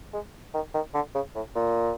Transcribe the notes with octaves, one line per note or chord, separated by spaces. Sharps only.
G#3
D#3
D#3
D3
C#3
A2
A#2